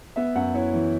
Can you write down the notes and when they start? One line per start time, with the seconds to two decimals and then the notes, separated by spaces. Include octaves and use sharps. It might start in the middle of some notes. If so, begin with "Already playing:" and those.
0.16 B3 E5
0.35 F#2 F#5
0.54 E4 C#5
0.74 E3